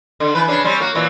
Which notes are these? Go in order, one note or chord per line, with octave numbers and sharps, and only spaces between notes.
D3
E3 B4
C#3 D4 B4
G3 C4 C#4
A#3 F#4
A#2 E3 F#3